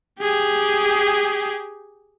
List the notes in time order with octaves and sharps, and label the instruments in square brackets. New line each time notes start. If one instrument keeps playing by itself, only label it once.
[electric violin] G4 G#4